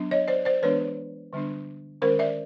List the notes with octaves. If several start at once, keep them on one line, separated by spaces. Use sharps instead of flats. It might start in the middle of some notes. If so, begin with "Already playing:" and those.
Already playing: F#3 B3 D4
C#5 D#5
C5 D5
C5 D5
E3 G#3 B3 D4 B4 C#5
D3 G3 B3 D4
D#3 G#3 C#4 A#4 C5
D5 E5